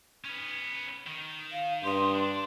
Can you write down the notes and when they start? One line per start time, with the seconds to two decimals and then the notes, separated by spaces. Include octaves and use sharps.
0.25 B3 C#4
1.07 D#3
1.53 F5
1.84 G2 G4 D#5 C6
2.15 D4